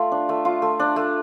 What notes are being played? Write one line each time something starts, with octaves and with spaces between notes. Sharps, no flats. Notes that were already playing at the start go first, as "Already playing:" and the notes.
Already playing: A3 F4
D4
A3
F4
A3
D4
A3